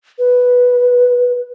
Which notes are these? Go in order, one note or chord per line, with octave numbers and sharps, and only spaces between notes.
B4